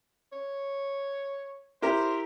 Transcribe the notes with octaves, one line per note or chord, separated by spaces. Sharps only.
C#5
E4 G4 A#4 C5